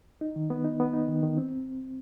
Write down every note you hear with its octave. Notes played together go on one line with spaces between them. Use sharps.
D#4
D#3
B3
D#4
B3
D#4
D#3
D#3
C4